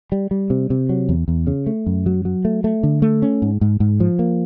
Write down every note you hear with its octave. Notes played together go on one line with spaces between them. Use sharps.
G3
G3
C3
C3
F#3
E2
E2
C#3
A3
F#2
F#3
F#3
A3
A3
D3
A3
C#4
G#2
G#2
G#2
F3
A#3